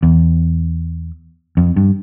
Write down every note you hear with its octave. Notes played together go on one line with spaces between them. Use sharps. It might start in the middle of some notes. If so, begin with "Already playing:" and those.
E2
F2
G2